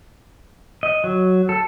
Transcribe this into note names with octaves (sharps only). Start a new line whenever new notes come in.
D#5
F#3
A4